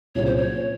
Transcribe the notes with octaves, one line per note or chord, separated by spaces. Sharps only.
C2 A#2 F#3 C#4 G#4 C#5
C5
C#5